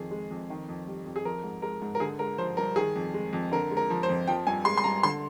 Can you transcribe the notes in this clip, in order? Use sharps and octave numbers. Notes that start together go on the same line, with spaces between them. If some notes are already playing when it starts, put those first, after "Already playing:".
Already playing: F2 D#3 G#4
G#3
F2
D#3
F2
G3
F2
G#4
F3 A#4
G#2
G#3 A#4
G#2
A#4
D3 G#4
G#3 A#4
F3 C5
G2 A#4
D#3 G#4
F2
G#3
F2
D3 A#4
G#3
A#4
F3
C5
F2
F3 G5
G2 G#5
G#3 C6
C6
G2 A#5
D3 C6